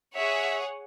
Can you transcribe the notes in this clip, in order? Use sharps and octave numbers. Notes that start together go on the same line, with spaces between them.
G#4 C#5 E5 F#5